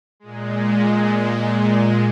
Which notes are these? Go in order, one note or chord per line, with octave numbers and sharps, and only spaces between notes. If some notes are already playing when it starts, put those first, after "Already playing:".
A#2 G#3